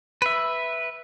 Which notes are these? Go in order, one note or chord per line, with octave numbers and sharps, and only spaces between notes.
B4 E5